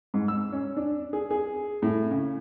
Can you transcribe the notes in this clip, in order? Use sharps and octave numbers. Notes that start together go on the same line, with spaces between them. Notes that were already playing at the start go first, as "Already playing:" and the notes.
G#2
E6
C#4
D4
G#4
G#4
A2
C#3